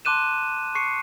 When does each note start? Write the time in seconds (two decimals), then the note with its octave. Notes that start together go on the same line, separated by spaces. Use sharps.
0.05 A5 C6 D6 F#6 D#7 E7
0.75 C#6 C7 C#7